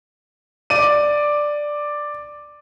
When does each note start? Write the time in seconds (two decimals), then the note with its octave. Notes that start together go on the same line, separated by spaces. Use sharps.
0.70 D5 D#7